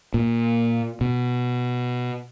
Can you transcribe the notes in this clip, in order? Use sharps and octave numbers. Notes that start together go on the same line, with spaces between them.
A#2
B2